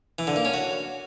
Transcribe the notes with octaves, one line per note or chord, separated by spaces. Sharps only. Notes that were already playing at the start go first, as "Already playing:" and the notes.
E3
D3
A#3
C#4
F#4